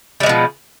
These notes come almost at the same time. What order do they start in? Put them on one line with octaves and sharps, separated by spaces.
G3 G#3 B2 F3